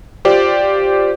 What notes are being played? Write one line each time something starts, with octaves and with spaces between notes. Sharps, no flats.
F4 G4 C5 D5